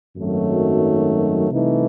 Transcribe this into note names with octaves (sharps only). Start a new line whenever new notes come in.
G#1 F#2 D#3 F#3 A3
C2 C3 E3 A3 D#4